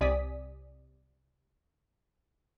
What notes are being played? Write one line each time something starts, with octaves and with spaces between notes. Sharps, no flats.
C2 C3 D5 G#5 D#6 B6